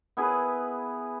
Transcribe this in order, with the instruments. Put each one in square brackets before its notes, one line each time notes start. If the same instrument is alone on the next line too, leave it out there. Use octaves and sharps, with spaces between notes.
[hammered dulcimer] B3 E4 G#4 B4